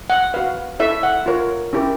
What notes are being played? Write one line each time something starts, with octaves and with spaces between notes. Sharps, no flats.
F#5
F#4 B4 F5
E4 A4 C#5 E5
F#5
F4 A#4 C#5
C#4 E4 G4 A#4